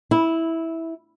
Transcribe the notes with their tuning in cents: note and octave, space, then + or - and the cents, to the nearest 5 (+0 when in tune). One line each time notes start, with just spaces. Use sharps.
E4 -10